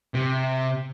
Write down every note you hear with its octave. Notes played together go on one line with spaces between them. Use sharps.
C3